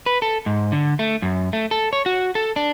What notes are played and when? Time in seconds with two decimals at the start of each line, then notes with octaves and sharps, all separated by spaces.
0.06 B4
0.22 A4
0.46 G#2
0.72 D3
0.99 A3
1.22 F#2
1.53 A3
1.71 A4
1.93 C#5
2.06 F#4
2.35 A4
2.56 D4